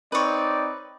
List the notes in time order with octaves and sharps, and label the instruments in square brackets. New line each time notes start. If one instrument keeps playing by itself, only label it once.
[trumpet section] C4 D#4 D5 [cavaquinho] B4 C#5